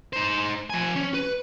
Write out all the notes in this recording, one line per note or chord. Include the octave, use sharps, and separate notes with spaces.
D#4 C5
F3 G#5
C#4
B4